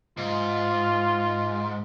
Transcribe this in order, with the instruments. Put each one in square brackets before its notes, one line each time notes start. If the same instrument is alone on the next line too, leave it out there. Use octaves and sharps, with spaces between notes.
[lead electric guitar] G#2 [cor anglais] F4